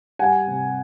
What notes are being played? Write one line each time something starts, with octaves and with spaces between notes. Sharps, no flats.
G3 F#5 G#5
C3